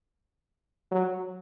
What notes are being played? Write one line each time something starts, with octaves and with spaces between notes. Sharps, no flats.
F#3